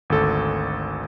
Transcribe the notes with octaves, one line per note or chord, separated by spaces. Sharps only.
G#1 D2 A4